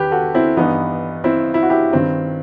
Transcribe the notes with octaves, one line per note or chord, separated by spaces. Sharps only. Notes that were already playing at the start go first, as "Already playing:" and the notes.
Already playing: E2 D#3 G4 B4
F#4 A4
C4 E4
G2 E3 B3 D#4
C4 E4
E4
F#4
E4 G4
G2 D#3 C4